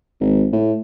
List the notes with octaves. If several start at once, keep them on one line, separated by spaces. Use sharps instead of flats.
G#1
A2